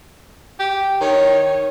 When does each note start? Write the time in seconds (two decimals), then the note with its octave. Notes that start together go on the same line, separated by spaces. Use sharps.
0.59 G4
1.01 D#3 C#5